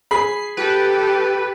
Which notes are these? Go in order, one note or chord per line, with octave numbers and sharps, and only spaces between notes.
G#4 B5 C7
G4 A4 B4